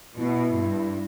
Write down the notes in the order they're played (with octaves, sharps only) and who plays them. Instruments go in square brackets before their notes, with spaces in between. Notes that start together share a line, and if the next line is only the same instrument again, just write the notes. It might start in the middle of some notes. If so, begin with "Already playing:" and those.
[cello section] B2 [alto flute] E4
[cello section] G2